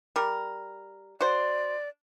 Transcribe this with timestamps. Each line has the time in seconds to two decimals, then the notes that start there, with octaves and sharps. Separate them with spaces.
0.16 G3 A#4
1.21 F#4 C5 D5